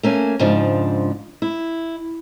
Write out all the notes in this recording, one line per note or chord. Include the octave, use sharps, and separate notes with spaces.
A3 A#3 C#4 G#5
G#2 C#3 F3 D4
E4